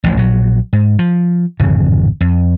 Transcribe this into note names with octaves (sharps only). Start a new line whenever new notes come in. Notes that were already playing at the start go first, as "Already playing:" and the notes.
A1 D2 F3
A#1 F#3
G#2
F3
D1 G#1 F2 C#3
F2